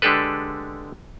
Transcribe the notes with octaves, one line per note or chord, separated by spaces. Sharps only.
D3 G#3 D4 G4 A4 B4